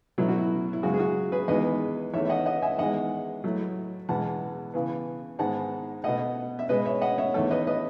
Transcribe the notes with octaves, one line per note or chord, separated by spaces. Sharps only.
B2 F#3 A3 E4
F#4
E4
E4
F#2 C#3 G#3 F#4
G#4
F#4
G#4 B4
E2 D#3 G#3 B3 B4 D#5
E2 D#3 A3 C#5 E5
E5
D#5 F#5
D#5 F#5
E5 G#5
E2 D#3 G#3 D#5 F#5
A2 F#3 A3
E2 B2 G#3 F#5 A5
C#3 E3 B3
G#2 D#3 G#3 B3 F#5 A5
B2 A3 D#5 F#5
E5
B2 G#3 B3 B4 D#5
C#5 E5
D#5 F#5
C#5 E5
E2 D#3 A3 A4 C#5
B4 D#5
B4 D#5